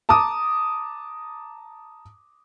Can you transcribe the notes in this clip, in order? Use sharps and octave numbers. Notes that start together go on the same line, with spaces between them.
A5 A#5 D6 D#6